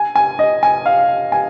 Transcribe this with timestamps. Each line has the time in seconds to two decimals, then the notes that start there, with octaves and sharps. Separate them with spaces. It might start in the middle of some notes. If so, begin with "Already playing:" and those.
Already playing: G#5
0.16 G#5
0.39 D#5
0.63 G#5
0.86 F5
1.32 G#5